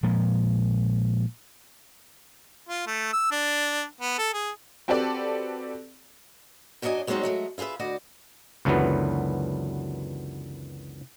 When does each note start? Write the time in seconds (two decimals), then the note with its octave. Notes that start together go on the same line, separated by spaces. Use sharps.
0.03 A#2 F3 G#3
2.69 F4
2.87 A3
3.13 E6
3.31 D4
4.01 B3
4.18 A4
4.34 G#4
4.88 C4 F#4 G4 A4 B4 D5
6.82 F#2 F#3 D4 A#4 D#5 G#5
7.07 F#3 G#3 C4 C#4 D#4 F#4
7.23 F#3 G#3 A3
7.58 E4 F4 G#4 B4 E5
7.80 D2 F#4 D5 D#5
8.65 C#2 F#2 D3 E3 F#3 B3